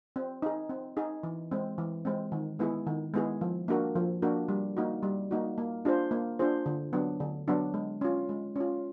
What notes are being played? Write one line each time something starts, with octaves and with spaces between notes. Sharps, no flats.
C4
D#4 G#4
C4
D#4 G#4
E3
G#3 C4
E3
G#3 C4
D#3
G#3 B3 E4 G#4
D#3
G#3 B3 E4 G#4
F3
A#3 D4 F#4 A#4
F3
A#3 D4 F#4 A#4
G3
A#3 D#4 F#4
G3
A#3 D#4 F#4
A#3
D4 F4 G#4 C5
A#3
D4 F4 G#4 C5
D3
F#3 B3 D4
D3
F#3 B3 D4
G#3
C#4 F4
G#3
C#4 F4